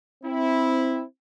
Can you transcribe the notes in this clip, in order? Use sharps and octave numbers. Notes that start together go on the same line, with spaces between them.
C4 E4